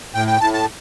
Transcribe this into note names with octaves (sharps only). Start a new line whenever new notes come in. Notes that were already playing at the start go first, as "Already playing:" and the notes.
A2 G5
G5
A2 A5
A5